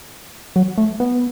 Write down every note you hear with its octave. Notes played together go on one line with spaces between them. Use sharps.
F#3
A3
B3